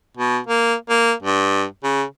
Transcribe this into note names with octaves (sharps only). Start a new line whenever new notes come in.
B2
A#3
A#3
G2
C#3